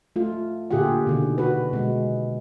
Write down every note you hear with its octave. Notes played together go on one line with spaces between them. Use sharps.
A3 F4
A#2 D3 F4 G4 G#4 F#5
B2 D3 D#3
F#4 B4
B2 G#3